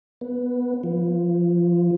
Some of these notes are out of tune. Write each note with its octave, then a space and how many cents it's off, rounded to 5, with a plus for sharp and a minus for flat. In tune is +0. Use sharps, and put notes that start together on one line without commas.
B3 -5
F3 -15